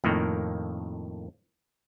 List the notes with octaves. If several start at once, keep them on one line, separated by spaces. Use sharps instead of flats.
F2 A2 D#3 A#3